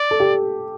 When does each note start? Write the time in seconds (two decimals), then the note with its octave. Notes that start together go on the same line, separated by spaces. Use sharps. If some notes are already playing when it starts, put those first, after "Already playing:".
Already playing: D5
0.11 A4
0.20 G4